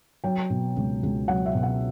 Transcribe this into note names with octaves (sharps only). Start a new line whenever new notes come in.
F#3 G5
B2
C#2
C#2
F#3 F#5
E5
B2
F#5